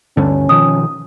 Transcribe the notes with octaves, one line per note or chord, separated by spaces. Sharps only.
D2 G2 D3 C#4
B2 D#3 F3 D#6